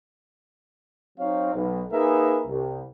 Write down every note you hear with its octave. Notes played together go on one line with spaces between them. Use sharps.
F#3 C4 D#4 C#5 F5
B1
A#3 D#4 G#4 A#4 B4 E5
C2